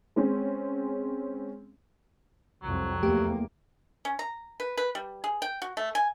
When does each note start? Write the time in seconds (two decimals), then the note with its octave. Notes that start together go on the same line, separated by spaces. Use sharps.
0.16 G#3 C4 C#4
2.62 C2 F2 F#3
3.03 E2 A3 A#3 G4
4.05 C#4
4.19 A#5
4.60 B4
4.77 B4
4.95 G3
5.24 G#4
5.42 G5
5.62 F#4
5.77 A3
5.95 G#5